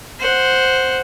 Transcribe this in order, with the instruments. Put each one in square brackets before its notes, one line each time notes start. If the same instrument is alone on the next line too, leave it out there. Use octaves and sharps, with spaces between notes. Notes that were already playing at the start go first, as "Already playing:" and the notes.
[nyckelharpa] C5 F#5